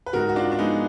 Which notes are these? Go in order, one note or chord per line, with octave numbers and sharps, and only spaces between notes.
B4
G#2 F#4 A#4
F#4
D4 F4
D4
F3 G#3 B3 D#4